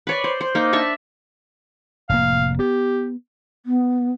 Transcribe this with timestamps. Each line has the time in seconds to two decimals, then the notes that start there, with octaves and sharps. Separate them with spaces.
0.07 B4 C#5 D5
0.24 C5
0.41 C5
0.55 A#3 D#4
0.73 D4 E5 A5 C#6
2.09 F1 A2 A#3 F5
2.59 B3 G4
3.66 B3